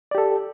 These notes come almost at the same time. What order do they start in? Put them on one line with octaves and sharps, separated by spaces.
D5 G4 A4